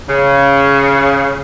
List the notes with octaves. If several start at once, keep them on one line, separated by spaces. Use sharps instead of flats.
C#3